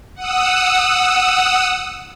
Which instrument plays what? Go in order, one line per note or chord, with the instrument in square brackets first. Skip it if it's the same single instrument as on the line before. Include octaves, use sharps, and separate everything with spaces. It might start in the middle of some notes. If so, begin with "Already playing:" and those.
[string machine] F#5 D#6 E6